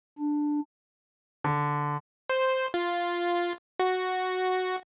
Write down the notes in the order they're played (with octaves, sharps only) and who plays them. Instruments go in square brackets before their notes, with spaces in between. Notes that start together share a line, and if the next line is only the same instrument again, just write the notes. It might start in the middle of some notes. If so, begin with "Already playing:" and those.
[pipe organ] D4
[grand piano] D3
[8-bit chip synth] C5
F4
F#4